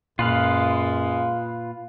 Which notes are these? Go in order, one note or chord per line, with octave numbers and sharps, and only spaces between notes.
F#2 A#2 G#3 F4 B4 F5